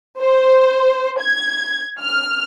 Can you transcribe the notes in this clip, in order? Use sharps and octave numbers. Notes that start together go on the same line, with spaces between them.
C5
G#6
F6